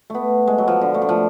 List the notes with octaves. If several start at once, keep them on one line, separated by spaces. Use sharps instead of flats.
A3 B3
G#3
F#3
F3
D3
A3
D3
F3